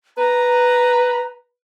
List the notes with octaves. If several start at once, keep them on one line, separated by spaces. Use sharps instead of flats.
B4 A#5